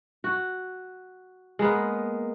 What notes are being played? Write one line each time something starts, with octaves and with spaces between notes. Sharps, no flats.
F#4
G#3 A#3 B3